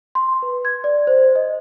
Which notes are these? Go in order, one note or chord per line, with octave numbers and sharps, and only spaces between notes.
C6
B4
G#6
D5
C5
D#5